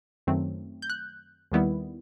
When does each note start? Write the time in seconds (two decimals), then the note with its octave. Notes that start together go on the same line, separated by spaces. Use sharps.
0.27 F#2 D#3 F#3 A3 C4
0.82 G6
0.90 F#6
1.52 D#2 D#3 G3 B3 E4